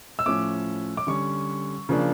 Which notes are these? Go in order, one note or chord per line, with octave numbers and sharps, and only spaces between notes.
E6
A2 F3 C#4 D6
D6
D3 G3 C#4 C#6
C#3 F3 A#3 D4